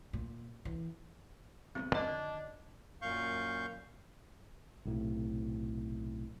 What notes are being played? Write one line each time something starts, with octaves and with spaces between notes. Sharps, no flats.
A#2
E3
D1 C2 B3 C4
F2 D3 D#3 D4 D#5
F#2 A#2 F5 C#6 G6
B1 A2 C3